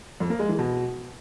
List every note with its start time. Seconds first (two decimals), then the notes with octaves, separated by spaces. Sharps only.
0.20 F2
0.30 A#3
0.39 G#3
0.49 E3
0.59 B2